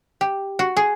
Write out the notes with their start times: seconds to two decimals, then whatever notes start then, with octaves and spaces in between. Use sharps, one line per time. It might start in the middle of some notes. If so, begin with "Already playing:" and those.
0.21 G4
0.59 F#4
0.77 G#4